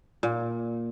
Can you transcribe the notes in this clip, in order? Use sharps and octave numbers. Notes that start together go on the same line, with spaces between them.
A#2